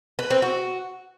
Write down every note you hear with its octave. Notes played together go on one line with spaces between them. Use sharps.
B4
C4
F#4